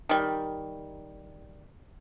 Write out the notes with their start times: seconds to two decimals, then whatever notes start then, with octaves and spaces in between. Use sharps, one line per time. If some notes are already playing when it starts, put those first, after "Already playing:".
0.09 D#3 G3